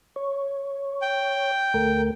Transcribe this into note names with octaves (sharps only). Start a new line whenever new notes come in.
C#5
G5
D2 A3 A#4